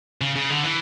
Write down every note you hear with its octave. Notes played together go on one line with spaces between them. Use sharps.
C#3
C#3
D3
E3